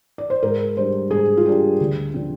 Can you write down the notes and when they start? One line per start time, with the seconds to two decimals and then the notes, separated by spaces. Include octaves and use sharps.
0.18 D5
0.30 C5
0.43 G#2 A#4
0.77 G3 D4 C5
1.11 G#2 G#4
1.37 F4
1.45 G3 D4 G4
1.80 D2
2.14 D3 F3 C4